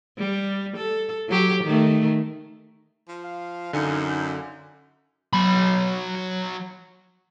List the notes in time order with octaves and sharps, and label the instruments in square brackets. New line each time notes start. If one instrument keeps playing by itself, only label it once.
[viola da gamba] G3
A4
F#3 G4
D#3 A3
[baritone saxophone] F3
[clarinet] F5
[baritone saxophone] F#2 [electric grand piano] D3 G#5 C#7 [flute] D#4
[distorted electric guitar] F#3 B5